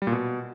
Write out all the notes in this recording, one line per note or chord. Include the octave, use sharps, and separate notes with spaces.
G3
A#2
B2